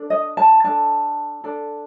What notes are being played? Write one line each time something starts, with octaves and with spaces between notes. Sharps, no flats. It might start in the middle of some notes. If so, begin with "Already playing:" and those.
Already playing: D4 A4
D#5
A5
D4 A4 A5
D4 A4